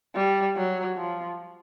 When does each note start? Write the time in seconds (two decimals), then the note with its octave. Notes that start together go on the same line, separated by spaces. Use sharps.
0.16 G3
0.56 F#3
0.96 F3